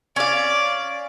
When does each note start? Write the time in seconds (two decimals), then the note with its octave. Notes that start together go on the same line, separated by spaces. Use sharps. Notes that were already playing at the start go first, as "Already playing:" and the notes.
0.16 C#4 D5 F5